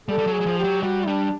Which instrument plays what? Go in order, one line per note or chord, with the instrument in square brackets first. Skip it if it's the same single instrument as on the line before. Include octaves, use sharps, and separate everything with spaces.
[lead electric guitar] G3 [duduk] A4
[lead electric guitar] G3
F#3
[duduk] G#4
[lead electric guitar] F#3
F3
[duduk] G4
[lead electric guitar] F#3
[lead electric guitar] G3 [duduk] F#4
[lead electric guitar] G3 [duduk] D4